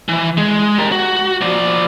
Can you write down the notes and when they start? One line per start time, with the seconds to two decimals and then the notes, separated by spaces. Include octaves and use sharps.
0.09 E3
0.37 G#3
0.78 G4 A#4
0.92 F#4
1.41 F3 D5